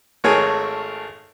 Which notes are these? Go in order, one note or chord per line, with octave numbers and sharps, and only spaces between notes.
G#1 A3 G#4 A#4 C#5